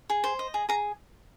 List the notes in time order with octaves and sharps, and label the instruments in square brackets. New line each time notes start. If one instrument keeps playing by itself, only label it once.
[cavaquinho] G#4
C5
D#5
G#4
G#4 A#5